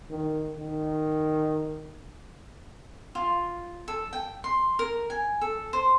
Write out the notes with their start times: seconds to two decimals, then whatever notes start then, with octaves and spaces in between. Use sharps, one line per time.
0.10 D#3
0.57 D#3
3.15 F4
3.88 A4
4.13 G5
4.44 C6
4.79 A#4
5.10 G#5
5.41 A4
5.73 C5